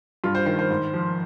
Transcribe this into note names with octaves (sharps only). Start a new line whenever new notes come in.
G2 F4
C5
D#3 C5
C5
G#2
F3